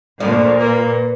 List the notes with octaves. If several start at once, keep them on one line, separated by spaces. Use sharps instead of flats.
D2 A#2 F3 D5
A#3 B4